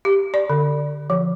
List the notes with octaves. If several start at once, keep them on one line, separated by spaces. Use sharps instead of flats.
G4
D5
D3
F3